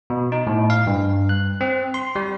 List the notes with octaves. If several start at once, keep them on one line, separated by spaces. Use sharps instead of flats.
B2
D#4
A2
F5
G2
F#6
C4
C6
G3